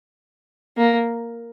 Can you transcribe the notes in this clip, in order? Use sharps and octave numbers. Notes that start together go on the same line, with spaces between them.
A#3